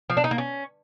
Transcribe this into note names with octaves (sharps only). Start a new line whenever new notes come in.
F3
D4
D#4
A#3
C#4